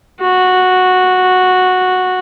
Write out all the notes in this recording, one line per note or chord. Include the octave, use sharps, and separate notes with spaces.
F#4